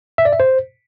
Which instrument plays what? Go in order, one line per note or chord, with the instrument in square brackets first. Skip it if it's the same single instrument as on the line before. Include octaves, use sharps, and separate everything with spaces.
[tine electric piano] E5
D5
E5
C5